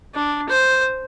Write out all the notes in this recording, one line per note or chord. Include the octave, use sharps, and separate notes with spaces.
D4
C5